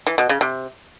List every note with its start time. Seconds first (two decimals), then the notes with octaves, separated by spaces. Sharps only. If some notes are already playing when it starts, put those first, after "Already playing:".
0.07 E3
0.18 B2
0.29 C#3
0.41 C3